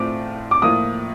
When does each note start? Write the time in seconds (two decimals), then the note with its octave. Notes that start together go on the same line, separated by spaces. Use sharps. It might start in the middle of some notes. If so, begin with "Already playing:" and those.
Already playing: A2 A3 C4 F4 D6
0.51 D6
0.62 A2 F3 A#3 F4 D#6